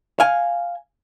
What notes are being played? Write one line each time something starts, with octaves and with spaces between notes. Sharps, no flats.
F5 G#5